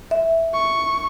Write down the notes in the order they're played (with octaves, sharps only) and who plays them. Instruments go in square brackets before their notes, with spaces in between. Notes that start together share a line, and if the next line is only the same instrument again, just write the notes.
[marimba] E5
[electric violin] C#6